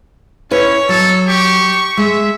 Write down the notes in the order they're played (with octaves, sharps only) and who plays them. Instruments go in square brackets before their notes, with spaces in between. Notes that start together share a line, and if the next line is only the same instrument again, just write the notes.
[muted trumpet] C#4 [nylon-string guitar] E4 B4 [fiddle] C#5
[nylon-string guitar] F#3 [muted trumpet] A4
[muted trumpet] G4 [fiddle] C#6
[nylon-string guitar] G#3 [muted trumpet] E5